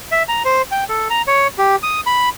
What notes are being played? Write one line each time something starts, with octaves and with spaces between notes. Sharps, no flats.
E5
A#5
C5
G5
A4
A#5
C#5
G4
D#6
B5